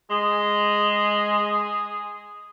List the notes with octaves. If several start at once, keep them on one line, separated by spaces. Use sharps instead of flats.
G#3 G#4